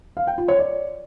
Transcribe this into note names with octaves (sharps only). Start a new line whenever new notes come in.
F5
G5
F4
C#5
D5